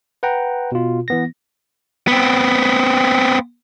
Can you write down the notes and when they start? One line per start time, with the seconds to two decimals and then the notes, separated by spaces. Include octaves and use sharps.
0.23 B4 F#5 G5 A#5
0.72 B2 F4
1.08 E3 B3 A#6
2.08 B3 C4